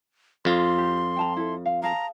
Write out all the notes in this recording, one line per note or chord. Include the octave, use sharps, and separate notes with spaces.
F2 F4 C6
G4 A#5
G5 A5 A#5
E4 A4
F5
G#4 F5 A5 A#5